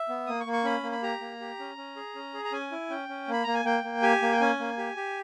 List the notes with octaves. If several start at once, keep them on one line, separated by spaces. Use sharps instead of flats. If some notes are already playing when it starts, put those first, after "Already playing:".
Already playing: E5
B3
A#3 D#6
C#6
A#3
C#6
C#4 B5
A#3
B5
G4 A#5
A#3
G4
C#4
C#4
G#4
C#4
G#4
A#5
C#4 G#5
E4
C#4 G5
C#4
A#3 B5
A#3 A#5
G#5
A#3 G5
A#3
G4 G#5
A#3
G5
C#4 G#5
A#3
G4
G4